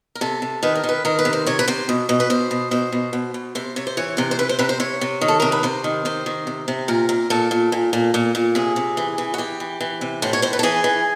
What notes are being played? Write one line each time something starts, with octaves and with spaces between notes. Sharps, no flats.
A#4
C3 A4
C3
D#3 B4
A#4
D#3
B4
D#3 A#4
B4
C3
C5
C3 C#5
B4
C3 C5
B2
B2
B4
B2 C5
B2
B2 C5
B2
B2
B2
C3 C5
C3 C#5
C5
E3 C#5
C3 C5
C5
C3 B4
C5
C3 B4
C5
C3 C#5
C3
D#3
A4
C3 A#4
B4
C3 C5
D#3
C3 C5
D#3
C3
C3
A#2 A#4
A#2
A#2 A4
A#2
A#2
A#2
A#2
A#2
C3 G#4
C3
E3
E3
F#4
E3 G4
E3
E3
C3
A2 C5
C#5
A2 C5
B4
A4
E3 G#4
E3